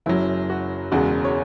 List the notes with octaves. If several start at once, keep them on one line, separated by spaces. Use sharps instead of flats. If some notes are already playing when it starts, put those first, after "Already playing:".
F#1 F#2 F#3 E4
F#4
E1 E2 C#3 G#3 F#4
C#5